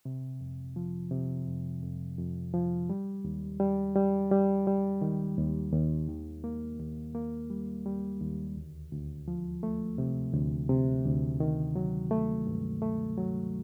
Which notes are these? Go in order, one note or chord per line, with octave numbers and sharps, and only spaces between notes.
C3
F2
F3
C3
F2
F2
F2
F3
G3
D#2
G3
G3
G3
G3
D#3
D#2
D#2
D#3
A#3
D#2
A#3
G3
G3
D#2
D2
D2
F3
A3
C3
D2
C3
D2
D#3
F#3
A3
G2
A3
F#3